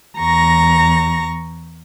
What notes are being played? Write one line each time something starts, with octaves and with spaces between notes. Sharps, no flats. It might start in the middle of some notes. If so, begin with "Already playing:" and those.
E2 A#5 C#6 A#6